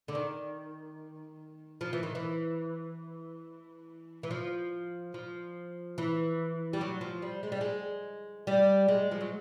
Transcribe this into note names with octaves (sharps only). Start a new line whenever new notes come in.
D3
D#3
F3
E3
D#3
E3
E3
F3
F3
E3
G3
F#3
F3
G3
G#3
G3
G#3
G3
G#3
F3
F#3